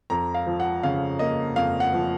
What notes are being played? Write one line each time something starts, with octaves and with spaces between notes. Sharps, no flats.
F2 A#5
F5
F3
F#5
C#3 F5
A#3 D#5
F2 F5
F#5
F3